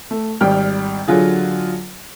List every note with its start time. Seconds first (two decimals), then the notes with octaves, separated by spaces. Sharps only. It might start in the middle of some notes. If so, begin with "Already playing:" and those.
0.11 A3
0.41 G#1 G3 G5 F6
1.08 D3 F#3 F4 G#4